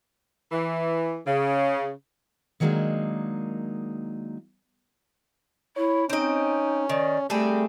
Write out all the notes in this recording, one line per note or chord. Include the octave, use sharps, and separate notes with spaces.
E3
C#3
D#3 F#3 G#3 A#3 D4 D#4
E4 C#5
C4 C#4 D#4 D#5
D#3 D5
G3 A3 C4 G#4 A4